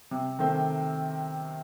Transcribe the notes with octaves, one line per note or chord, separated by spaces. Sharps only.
C3
D#3 A3 C4